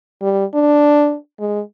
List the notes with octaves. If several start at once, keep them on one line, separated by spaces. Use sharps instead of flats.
G3
D4
G#3